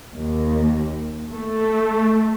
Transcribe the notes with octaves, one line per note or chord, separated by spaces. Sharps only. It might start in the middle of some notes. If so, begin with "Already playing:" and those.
D#2
A3